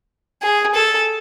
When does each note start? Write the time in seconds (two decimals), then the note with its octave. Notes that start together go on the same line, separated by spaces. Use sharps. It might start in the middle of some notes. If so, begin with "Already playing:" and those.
0.43 G#4
0.75 A4